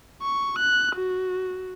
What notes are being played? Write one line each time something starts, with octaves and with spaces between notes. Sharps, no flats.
C#6
F#6
F#4